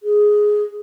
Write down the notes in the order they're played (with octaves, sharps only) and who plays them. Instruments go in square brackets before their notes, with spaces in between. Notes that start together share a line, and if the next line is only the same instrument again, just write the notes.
[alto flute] G#4